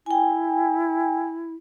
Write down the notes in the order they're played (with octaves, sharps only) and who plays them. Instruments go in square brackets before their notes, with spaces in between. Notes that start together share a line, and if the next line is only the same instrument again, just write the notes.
[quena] E4 [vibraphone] G5 G#5